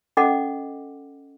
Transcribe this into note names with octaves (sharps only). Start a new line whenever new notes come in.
C#4 A4 D#5 F#5 D6